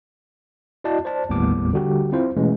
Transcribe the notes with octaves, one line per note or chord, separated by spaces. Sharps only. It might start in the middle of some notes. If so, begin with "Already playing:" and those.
E4 F#4 D5 D#5 A5
C5 D5 A5
G1 D#2 A2 G3 B3 D6
D3 G3 F#4 G4
C4 E4 F4 C5
B2 E3 G#3 A3 C#4